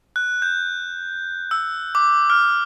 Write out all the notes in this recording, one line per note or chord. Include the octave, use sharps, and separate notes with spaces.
F#6
G6
E6
D6
F6